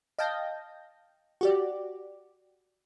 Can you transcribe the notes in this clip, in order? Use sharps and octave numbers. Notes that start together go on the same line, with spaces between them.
D#5 F5 G5 A5 G6 A#6
F#4 G4 D5